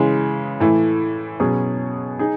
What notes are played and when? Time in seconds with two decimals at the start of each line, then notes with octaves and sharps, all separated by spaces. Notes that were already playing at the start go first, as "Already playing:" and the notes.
Already playing: C#3 E3 G#3
0.60 A2 E3 A3
1.40 B2 F#3 C#4 G#4
2.19 D#4 G#4